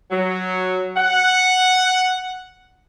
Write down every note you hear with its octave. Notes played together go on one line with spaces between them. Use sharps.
F#3
F#5